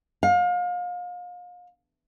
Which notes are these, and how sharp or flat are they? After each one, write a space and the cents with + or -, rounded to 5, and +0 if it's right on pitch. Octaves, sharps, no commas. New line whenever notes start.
F5 +35